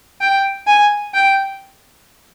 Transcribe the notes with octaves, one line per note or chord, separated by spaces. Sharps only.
G5
G#5
G5